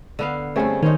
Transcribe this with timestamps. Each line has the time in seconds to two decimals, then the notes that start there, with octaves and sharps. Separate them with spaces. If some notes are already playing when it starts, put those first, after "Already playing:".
0.19 D3 B3 F5
0.56 G2 A3 C4 C#4 G#4
0.83 D#3 C#4 D#4 C5 C#5